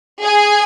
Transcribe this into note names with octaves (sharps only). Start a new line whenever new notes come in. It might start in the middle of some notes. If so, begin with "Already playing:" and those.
G#4 G#5